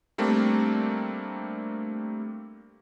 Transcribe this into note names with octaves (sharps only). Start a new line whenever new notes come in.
G3 A3 A#3 C4 D4